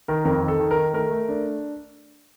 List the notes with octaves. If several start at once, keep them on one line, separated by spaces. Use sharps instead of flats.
D#3 A#4
F2 A#4
D#3
A4
D#3
A#4
D#3
A3 A#4
A3
D4